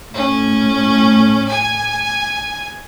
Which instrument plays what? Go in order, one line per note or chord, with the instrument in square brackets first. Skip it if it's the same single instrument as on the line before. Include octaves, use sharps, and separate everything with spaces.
[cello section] A2 [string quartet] C#4
[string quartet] G#5